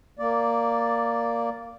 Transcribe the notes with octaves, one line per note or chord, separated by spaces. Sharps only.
A#3 D5